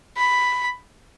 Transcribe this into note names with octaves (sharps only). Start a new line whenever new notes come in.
B5